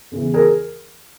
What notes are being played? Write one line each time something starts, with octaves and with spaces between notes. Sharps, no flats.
E2 C#3 E3
G#4 A#4